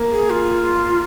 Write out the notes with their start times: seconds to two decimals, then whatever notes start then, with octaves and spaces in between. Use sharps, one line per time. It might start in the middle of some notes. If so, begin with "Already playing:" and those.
Already playing: A#3
0.11 G#4
0.30 F4